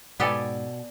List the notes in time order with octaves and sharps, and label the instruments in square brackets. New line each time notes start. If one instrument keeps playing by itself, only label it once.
[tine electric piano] G#2 [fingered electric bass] B2 [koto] B3 G4 A4 [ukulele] D5 G#5